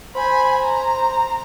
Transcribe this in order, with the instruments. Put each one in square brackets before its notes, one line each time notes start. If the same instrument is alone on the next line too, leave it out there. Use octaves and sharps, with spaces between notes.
[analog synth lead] C5 [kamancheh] G#5 B5
[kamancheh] A#5